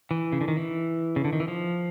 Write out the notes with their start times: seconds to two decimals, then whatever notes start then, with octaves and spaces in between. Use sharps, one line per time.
0.11 E3
0.32 C#3
0.41 D3
0.48 D#3
0.57 E3
1.16 C#3
1.25 D3
1.33 D#3
1.40 E3
1.48 F3